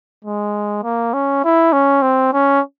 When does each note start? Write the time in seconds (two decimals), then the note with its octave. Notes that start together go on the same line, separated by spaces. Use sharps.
0.25 G#3
0.83 A#3
1.13 C#4
1.44 E4
1.73 C#4
2.02 C4
2.33 C#4